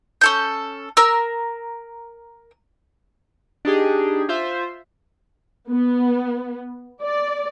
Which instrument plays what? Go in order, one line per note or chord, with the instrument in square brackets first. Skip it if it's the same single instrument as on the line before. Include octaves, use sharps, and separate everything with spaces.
[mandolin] C#4 A4 G6
A#4 E6
[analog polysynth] D4 D#4 G4 G#4
F4 C5 E5
[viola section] B3
D5